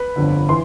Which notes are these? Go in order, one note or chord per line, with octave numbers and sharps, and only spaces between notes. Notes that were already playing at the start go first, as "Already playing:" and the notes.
Already playing: B4 B5
G1 F2 D3
E3 C6